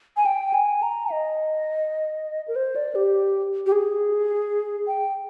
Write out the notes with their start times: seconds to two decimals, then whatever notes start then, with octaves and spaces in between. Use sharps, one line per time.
0.16 G#5
0.26 G5
0.53 G#5
0.83 A#5
1.12 D#5
2.48 A#4
2.56 C5
2.76 D5
2.95 G4
3.66 G4
3.72 G#4
4.87 G5